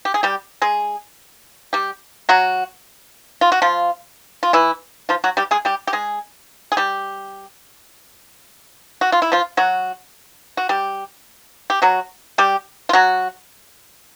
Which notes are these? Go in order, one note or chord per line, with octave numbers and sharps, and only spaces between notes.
G4
G#4
G3 G4
G#3 G#4
G3 G4
F#3 F#4
F4
F#4
F3 F4
F4
E3 E4
F3 F4
F#3 F#4
G3 G4
G#3 G#4
G3 G4
G4
G#3 G#4
G#4
G3 G4
F#4
F4
E4
F3 F4
F#3 F#4
F#4
G3 G4
G4
F#3 F#4
G3 G4
F4
F#3 F#4